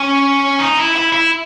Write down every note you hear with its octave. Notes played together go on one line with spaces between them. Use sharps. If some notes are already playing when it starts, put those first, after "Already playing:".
Already playing: C#4
D#4
E4
E4
E4